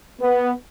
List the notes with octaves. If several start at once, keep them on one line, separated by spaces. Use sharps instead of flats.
B3